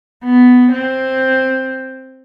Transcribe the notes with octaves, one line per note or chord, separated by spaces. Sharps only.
B3
C4